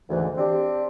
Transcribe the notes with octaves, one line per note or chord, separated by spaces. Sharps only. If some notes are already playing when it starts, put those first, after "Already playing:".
D2 G#2 E3
C4 D4 G4